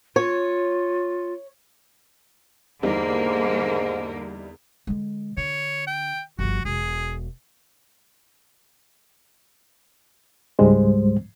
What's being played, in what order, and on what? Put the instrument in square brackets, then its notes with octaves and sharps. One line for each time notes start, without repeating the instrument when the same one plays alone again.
[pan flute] F4 [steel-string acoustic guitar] C#5
[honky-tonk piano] E2 G3 D#4 [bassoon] G#2 [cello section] D3 A#3
[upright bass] D3 G#3
[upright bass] D3 [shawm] C#5
[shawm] G5
[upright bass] G1 F3 [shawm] F#4
[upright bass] E1 [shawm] G#4
[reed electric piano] C#2 G#2 G3 G#3 C5